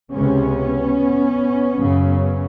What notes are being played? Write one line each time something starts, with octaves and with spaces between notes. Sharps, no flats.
C#2 C3 B3 C#4
F#2 C#3